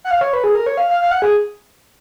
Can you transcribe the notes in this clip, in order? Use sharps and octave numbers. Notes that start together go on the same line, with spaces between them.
F#5
F5
C#5
B4
G#4
A#4
C#5
F5
F5
F5
F#5
G#4